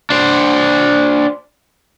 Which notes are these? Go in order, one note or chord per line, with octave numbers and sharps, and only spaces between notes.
D4 C5